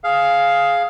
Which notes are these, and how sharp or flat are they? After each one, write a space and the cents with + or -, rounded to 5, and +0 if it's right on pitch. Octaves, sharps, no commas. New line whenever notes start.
G#4 +10 F5 +0